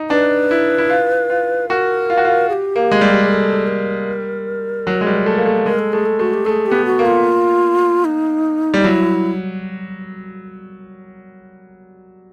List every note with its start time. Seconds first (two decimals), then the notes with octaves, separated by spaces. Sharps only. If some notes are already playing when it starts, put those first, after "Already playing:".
Already playing: D#4
0.10 D4 B4
0.51 E4
0.78 E4
0.90 F4
1.30 F4
1.69 F#4 A#4
2.10 F4
2.17 F#4
2.25 F4
2.49 G#4
2.53 G4
2.76 A#3
2.92 G#3
3.01 G3
3.29 A#4
3.33 A4
3.67 A#4
4.87 F#3
5.01 G#3
5.07 G3
5.26 A3
5.38 A#3
5.46 A3
5.66 G#3 A#4
5.79 A4
5.92 A3 G#4
6.06 A4
6.19 A3 F#4
6.33 G4
6.45 A3 G#4 A4
6.66 G4
6.71 B3
6.86 F#4
6.99 A#3
7.06 F4
8.05 D#4
8.74 G3
8.84 F#3 E4